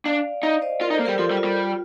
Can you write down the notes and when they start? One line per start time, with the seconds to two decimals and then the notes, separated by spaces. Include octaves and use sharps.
0.05 D4 D5 F5
0.43 D#4 D5 F5
0.61 C5 D#5
0.81 F4 A#4 D5
0.90 D#4
0.93 A4 C5
0.99 A#3
1.05 G3 G4 A#4
1.18 F3 F4 A4
1.31 G3
1.37 F4
1.44 G3
1.57 F4